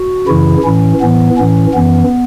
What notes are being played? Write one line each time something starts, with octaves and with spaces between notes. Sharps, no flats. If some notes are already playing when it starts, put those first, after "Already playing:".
Already playing: F#4
F#2 C#3 E3 E4
A2 E3 C#4
A2 E3 B3
A2 E3 C#4
F#2 E3 B3